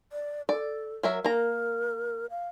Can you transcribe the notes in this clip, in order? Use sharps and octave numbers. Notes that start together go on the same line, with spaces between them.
D5
A4 D5
F#3 A#4 E5
A#3 A#4 A#5
F5